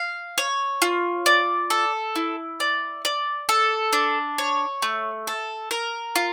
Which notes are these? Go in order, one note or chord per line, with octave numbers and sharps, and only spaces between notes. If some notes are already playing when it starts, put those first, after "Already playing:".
Already playing: F5
C#5
F4
D5
A4
E4
D5
D5
A4
D4
C#5
A3
A4
A#4
F4